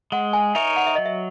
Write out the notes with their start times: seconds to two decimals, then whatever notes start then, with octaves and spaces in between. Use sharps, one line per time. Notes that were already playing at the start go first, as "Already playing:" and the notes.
0.12 G#3 F#5
0.33 G#5
0.55 D#4 A#4 C#5 E5
0.76 F#5
0.87 E5
0.95 F#3 D#5
1.06 E5